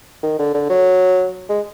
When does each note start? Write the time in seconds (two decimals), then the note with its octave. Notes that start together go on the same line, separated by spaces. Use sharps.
0.23 D#3
0.39 D3
0.55 D3
0.70 F#3
1.49 G#3